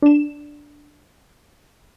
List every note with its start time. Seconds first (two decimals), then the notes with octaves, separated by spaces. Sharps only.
0.02 D4 E7